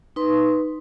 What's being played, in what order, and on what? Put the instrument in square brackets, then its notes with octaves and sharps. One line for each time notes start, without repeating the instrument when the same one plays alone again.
[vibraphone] D#4 B4 C6